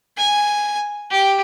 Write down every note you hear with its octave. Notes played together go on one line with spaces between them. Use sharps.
G#5
G4